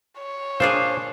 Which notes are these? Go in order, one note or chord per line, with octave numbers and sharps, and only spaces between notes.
C#5
A#2 D4 G#4 C5 F5